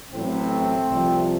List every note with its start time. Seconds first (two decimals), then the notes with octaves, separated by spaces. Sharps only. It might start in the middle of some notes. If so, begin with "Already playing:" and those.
0.11 A1 A2 F#3 A3 C4
0.89 C2 C3 F3